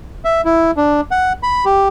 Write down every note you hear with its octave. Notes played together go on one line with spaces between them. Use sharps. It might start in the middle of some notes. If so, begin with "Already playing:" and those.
E5
E4
D4
F#5
B5
G4